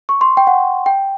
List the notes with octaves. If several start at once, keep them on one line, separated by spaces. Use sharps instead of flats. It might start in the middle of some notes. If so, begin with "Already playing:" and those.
C#6
C6
G5
F#5
G5